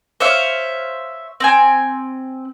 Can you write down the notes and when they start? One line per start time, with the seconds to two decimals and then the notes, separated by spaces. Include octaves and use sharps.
0.20 C5 C#5 E5 F5
1.40 C4 G5 G#5